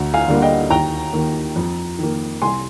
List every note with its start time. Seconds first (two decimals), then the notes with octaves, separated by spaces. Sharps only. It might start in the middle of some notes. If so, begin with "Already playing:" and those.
Already playing: D2 A#5
0.14 F5 G#5
0.28 D3 G3 A#3
0.42 D#5 G5
0.70 D#2 G5 A#5
1.13 D#3 A#3
1.56 F2
1.99 D#3 A#3
2.42 C2 G#5 C6